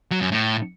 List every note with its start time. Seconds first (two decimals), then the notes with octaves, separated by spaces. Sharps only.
0.12 F#3
0.21 F#2
0.31 A2